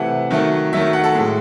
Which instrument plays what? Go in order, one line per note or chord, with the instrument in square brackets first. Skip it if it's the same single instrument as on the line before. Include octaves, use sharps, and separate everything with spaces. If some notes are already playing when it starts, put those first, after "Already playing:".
Already playing: [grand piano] C3 E3 A3 F#5
D#3 F#3 A3
D#3 F#3 A3 E5
F#5
A4
A2 G#3